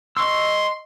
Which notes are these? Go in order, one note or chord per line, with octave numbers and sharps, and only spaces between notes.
D#5 C6 C#6 E6